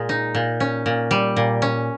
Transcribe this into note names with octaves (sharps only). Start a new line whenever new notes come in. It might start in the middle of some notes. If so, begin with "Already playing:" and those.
Already playing: A#2 G#3
D#4
A#2
C#4
A#2
G3
A#2
C#4